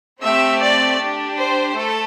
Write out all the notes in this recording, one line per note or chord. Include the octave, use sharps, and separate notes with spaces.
A3 C4 G4 E5
D5
D4 G4
C5
A3 A4